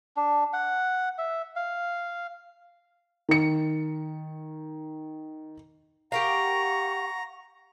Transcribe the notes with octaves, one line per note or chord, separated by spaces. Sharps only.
D4
F#5
E5
F5
D#3 C#7
G4 A#4 F5 F#5 A#5 C#6